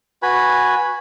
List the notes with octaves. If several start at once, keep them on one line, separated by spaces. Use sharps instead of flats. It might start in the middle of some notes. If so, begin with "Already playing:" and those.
F#4 B4 G#5 B5